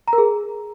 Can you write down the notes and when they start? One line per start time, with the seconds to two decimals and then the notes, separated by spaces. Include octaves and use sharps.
0.08 A#5
0.13 A#4
0.18 G#4